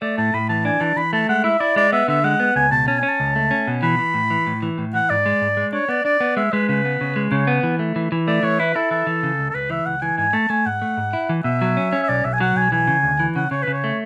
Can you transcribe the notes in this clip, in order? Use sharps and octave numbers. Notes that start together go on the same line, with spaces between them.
A3 D5
A2 A5
A2 B5
E3 A5
D4 G#5
E3 A5
E3 B5
A3 A5
G#3 F#5
E4 E5
E4 D5
G#3 D5
B3 E5
D3 E5
G#3 F#5
B3
C#2 G#5
B2 A5
C#4 A5
G#5
C#4
A5
C#2
A3
C#4
B2
E3 B5
E3
A2
E3
A2
E3
A2
E3 F#5
G#2 D5
G#3
G#2
G#3
D4 C#5
B3 D5
D4 D5
B3
G#3 E5
G#3 B4
C#3 B4
B3
C#3
G#3
C#3 C#5
B3
E3
A3
E3
E3
A3 D5
E3 C#5
E4 B4
E4 A4
E3 A4
E3
C#3
C#2
A4
C#2 B4
E3 E5
C#2 F#5
E3 G#5
G#2 G#5
A3 A5
A3 G#5
G#2 F#5
A3
G#2
E4
E3
B2 E5
F#3
C#4
C#4
E5
B1 D5
B1 E5
G#5
F#3 F#5
B1 G#5
E3 G#5
C#3
D2
E3
C#3 F#5
C#3 C#5
B4
C#3
C#5
A3